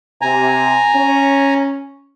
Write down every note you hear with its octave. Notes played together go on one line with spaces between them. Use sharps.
C3 G#5 A#5
C#4